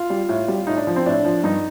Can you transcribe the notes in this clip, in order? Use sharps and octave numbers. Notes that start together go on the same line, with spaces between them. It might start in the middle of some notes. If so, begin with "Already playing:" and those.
Already playing: F4
G3
A2
G3
A2 D#4
D4
F3
C4
A2 D4
F3
G2 D#4